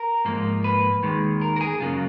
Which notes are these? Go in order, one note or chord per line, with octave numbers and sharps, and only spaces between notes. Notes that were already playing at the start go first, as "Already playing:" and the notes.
Already playing: A#4
G#2 F3 A#3
B4
D#2 D#3 G#3
A#4
A#4
G#4
F#2 C#3 F#3 A#3 F4